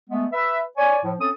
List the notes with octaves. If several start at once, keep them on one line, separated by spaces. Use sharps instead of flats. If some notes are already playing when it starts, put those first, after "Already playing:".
G#3 A3 B3
B4 E5
C#5 D5 G#5
A2 F3
C4 C#4 A4 D#6